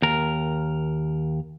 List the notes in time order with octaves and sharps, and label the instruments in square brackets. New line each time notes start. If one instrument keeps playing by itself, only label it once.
[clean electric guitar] D#2 A#4